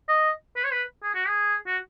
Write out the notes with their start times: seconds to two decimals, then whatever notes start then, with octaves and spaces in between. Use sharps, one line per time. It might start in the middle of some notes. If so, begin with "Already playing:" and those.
0.08 D#5
0.56 B4
0.64 C#5
0.72 B4
1.03 G#4
1.15 F#4
1.28 G#4
1.66 F#4